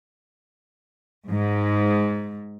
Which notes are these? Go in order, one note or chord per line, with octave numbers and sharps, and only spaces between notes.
G#2